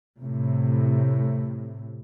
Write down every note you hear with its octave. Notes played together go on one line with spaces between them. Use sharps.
A2 C3